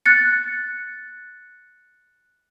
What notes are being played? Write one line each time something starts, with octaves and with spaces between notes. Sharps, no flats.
F#6 A6 C#7